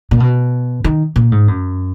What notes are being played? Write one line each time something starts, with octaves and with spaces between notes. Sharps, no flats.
A#2
B2
D#3
A#2
G#2
F#2